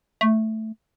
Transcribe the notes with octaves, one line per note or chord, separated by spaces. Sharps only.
A3